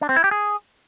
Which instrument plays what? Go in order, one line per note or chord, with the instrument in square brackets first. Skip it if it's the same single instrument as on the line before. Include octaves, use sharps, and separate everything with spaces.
[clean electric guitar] D4
C4
E4
G4
G#4